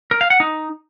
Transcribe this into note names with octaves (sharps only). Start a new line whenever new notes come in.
A#4
F5
F#5
D#4